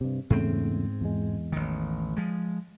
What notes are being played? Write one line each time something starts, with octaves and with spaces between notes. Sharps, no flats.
G2 C3
E2 G#2 C#3 A3 C4
E2 G#3
A1 D#3
F3 G#3